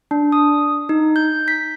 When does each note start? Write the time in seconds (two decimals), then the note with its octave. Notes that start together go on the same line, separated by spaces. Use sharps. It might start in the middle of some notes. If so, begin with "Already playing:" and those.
0.11 D4
0.32 D#6
0.89 D#4
1.16 G6
1.48 B6